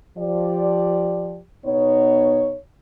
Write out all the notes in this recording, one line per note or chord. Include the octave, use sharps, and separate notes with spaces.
F3 G4 D5
B2 B3 D#4 C#5